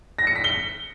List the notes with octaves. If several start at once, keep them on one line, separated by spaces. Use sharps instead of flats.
A#6
C#7
B6
G7